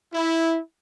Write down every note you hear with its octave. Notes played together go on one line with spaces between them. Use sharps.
E4